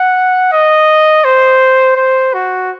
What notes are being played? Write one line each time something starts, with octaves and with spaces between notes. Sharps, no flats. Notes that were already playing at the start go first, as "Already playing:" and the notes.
Already playing: F#5
D#5
C5
C5
F#4